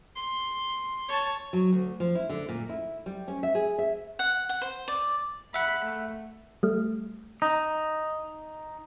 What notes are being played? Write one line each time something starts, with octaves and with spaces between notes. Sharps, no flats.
C6
C#5 A5
F#3
D2
F3
E4
D3
A#2
E4
G3
C#4
E5
G#4
E5
F#5
F#5
C5
D5
E5 F#5 B5
A3
G3 A3
D#4